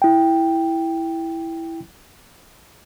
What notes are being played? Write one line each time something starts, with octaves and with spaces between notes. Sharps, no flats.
E4 G5